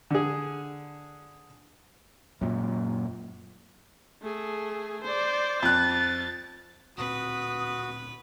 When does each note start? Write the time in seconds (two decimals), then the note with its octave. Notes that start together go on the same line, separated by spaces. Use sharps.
0.10 D3 G#4
2.41 F#2 A#2
4.22 A3 G#4
5.04 C5 D5
5.62 F2 F#6 A6
6.98 D1 A#2 C4 F#4 B4 D#6